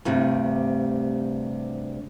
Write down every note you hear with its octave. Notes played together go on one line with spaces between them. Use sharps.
D2 G2 C3